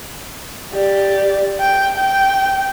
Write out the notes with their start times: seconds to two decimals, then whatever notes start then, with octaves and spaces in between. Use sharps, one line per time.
0.74 G4 D5
1.60 G5
1.97 G5